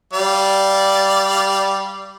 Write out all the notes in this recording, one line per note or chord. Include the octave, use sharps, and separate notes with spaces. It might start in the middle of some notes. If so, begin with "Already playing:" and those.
G3 D5 F5